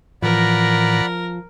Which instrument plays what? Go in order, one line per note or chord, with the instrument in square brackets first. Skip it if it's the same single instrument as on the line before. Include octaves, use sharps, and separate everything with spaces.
[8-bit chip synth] A2 E3 A#6 [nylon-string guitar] F3 [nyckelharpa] A#4 [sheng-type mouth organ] D5 F#5 B5